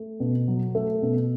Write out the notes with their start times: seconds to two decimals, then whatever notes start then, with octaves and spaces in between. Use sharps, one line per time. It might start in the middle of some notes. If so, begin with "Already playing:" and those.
Already playing: A3
0.20 B2
0.48 F#3
0.75 A3
1.02 B2